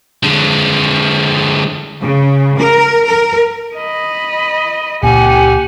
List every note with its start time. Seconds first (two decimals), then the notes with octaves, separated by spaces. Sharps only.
0.24 D3 G#3
2.02 C#3
2.59 A#4
3.04 A#4
3.76 D#5 B5
5.03 C#2 A#2 A#3 G4 F#5 G#5